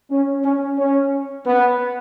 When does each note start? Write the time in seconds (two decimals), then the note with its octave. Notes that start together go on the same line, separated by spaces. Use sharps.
0.11 C#4
0.44 C#4
0.78 C#4
1.45 B3